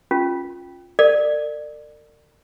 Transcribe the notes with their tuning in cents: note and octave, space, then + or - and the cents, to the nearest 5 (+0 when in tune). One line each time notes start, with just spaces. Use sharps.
C#4 +0 F4 +10
A#4 -45 D5 +25